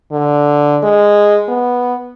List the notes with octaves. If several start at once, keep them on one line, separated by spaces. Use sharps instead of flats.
D3
G#3
B3